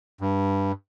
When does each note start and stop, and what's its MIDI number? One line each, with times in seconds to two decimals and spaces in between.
0.21 0.72 43